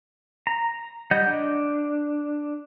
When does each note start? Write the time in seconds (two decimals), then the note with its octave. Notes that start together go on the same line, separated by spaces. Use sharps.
0.47 A#5
1.11 G3 D#5 F#5 G6
1.27 D4